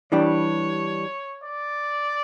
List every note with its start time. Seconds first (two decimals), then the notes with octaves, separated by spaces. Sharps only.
0.12 E3 G3 D4 G4 C#5
1.44 D5